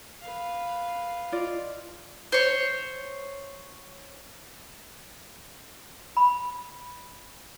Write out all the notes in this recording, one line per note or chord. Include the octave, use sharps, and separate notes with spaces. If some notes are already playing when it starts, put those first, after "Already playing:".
B4 F5
F4 D5 D#5
C5 C#5
B5